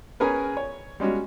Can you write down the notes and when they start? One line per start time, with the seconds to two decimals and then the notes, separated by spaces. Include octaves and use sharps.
0.20 C#4 G#4 A#4 B4
0.57 C#5
1.00 G3 G#3 C#4 F#4